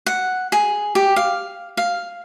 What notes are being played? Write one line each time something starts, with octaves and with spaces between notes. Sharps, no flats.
F#5
G#4
G4
F5
F5